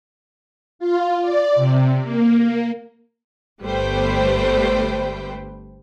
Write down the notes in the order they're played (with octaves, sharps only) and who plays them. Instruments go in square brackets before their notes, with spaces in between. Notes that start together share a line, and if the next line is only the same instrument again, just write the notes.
[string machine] F4
D5
C3
A#3
[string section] G1 G3 A3 B4 C5 G5